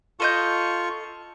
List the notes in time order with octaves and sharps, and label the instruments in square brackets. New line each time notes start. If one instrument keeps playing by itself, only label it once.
[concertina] F4 C#6 [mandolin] A4 D#5 G6